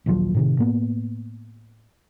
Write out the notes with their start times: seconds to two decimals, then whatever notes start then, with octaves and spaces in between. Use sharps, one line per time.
0.06 A#1 D#2 F3 F#3
0.34 A2 C3 D#3
0.58 A2 A#3 B3